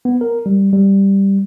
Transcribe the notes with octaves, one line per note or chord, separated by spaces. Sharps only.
B3
A#4
G3
G3